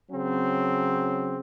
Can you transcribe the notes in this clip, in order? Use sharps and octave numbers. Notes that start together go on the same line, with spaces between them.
C#3 F#3 C4